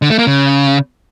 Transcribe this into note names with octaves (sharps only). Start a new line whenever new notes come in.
D3
A3
A#3
C#3